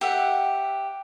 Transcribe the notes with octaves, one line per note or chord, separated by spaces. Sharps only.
G4 E5 F#5